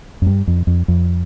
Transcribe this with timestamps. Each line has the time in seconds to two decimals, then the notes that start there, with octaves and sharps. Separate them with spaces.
0.22 F#2
0.26 G2
0.47 F2
0.67 F2
0.88 F2